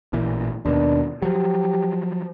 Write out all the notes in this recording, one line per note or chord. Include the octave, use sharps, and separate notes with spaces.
A1 A#2 E3
D#2 B2 D4
F3 F#3 G4